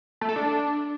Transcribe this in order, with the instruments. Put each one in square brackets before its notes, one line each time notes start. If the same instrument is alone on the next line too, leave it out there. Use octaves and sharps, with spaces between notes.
[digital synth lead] A3
A4
D4